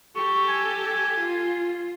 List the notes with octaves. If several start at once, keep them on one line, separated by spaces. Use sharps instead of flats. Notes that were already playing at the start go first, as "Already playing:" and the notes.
G4 A4 C#6
G#5
F4